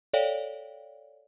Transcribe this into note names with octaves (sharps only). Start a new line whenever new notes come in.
A4 C#5 D5 F5 G5